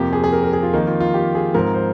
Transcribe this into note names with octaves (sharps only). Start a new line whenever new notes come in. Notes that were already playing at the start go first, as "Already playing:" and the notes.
Already playing: F2 C3 F3 A#3 G4
G#4
G#4
A#4
A#4
G#4
F4
F2 D#3 A#3 D#4
F4
F4
G4
G#4
G#2 F3 C4 A#4
C5